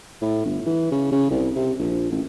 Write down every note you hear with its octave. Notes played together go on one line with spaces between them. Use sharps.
A2
G1
E3
C#3
C#3
C2
C3
A#1
A1